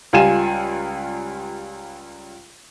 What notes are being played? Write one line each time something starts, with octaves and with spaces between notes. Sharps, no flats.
C#2 G3 F4 G#5 E7